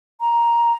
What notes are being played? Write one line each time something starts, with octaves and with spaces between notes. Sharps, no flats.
A#5